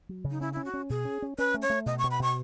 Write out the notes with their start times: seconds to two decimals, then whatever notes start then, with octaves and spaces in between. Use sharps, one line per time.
0.09 F#3
0.24 C#3
0.30 D#4
0.41 C#4 E4
0.53 C#4 E4
0.65 F#4
0.74 C#4
0.89 B2 G#4
1.05 C#4
1.22 C#4
1.38 C#4 B4
1.54 A3
1.62 C#5
1.70 A3
1.86 B2 D#5
1.98 C#6
2.03 B2
2.11 B5
2.19 B2 C#6